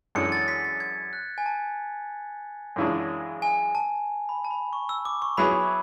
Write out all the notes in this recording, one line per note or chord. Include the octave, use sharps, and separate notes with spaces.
F#2 E3 G#3 D4 A4 C#7
A6
B6
A6
G#6
F#6
G#5
A5
F#2 C#3 E3 G#3 D4
G#5
A5
B5
A5
B5
C#6
E6
D6
C#6
F#3 B3 E4 G#4 B5